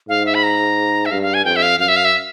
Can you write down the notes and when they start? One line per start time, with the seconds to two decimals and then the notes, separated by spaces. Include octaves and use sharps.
0.09 G#2 F5
0.26 E5
0.34 B5
0.43 A#5
1.06 E5
1.11 G2 F5
1.22 F5
1.34 G#5
1.45 F2 G5
1.56 E5
1.62 F5
1.79 F#2 F5
1.88 E5
1.96 F5
2.05 E5